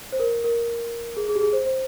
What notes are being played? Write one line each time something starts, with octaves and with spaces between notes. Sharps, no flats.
C5
A#4
A#4
G#4
G#4
G4
G#4
C5
C5